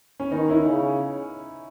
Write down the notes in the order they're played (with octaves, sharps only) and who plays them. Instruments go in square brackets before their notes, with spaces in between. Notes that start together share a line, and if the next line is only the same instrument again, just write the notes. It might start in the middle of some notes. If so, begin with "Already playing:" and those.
[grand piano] C#4
[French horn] D#3 [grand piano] B3 D#4
[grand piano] C#4 E4
[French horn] C#3